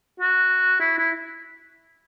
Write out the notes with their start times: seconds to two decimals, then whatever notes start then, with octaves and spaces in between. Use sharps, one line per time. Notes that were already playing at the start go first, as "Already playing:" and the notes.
0.20 F#4
0.80 E4
0.99 E4